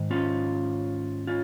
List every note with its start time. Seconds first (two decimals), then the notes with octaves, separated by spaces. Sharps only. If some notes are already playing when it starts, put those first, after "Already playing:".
Already playing: G#2 D#3
0.11 C#4 F4
1.27 C#4 F4